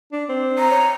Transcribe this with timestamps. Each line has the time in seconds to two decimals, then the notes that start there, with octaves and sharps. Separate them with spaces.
0.12 D4
0.29 C4
0.58 A#5
0.71 C#5